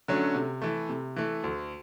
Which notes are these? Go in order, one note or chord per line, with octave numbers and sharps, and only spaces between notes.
D3 F#3 A3 C#4
C3
E3 A3
C3
E3 A3
D2